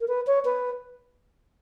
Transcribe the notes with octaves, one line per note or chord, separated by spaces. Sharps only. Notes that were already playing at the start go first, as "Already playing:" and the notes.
A#4
B4
C#5
B4